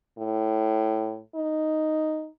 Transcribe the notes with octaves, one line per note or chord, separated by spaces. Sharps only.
A2
D#4